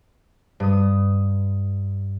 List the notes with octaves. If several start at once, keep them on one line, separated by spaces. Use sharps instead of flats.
G2 D#6